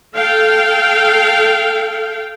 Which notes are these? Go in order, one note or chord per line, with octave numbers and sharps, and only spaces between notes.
A4 F5 G5